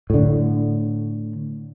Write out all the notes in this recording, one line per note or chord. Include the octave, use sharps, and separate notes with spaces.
A2 D3